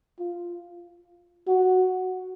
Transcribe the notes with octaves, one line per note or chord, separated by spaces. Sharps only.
F4
F#4